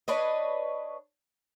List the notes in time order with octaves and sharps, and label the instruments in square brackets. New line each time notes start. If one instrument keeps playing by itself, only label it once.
[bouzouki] D4 B4 C#5 D#5